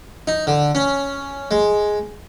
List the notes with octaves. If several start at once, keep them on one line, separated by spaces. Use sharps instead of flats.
D#4
D3
C#4
G#3